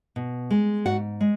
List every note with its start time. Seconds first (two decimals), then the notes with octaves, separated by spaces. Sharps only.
0.16 B2
0.51 G#3
0.85 G#2 F#4 F#5
1.21 G#3